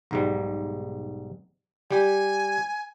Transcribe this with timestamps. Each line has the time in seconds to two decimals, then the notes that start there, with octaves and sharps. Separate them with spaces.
0.11 B1 G#2 G3
1.91 G3 G4 G#5